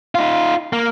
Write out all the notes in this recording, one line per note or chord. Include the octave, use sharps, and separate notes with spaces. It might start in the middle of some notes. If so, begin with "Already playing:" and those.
D#4 F4
A#3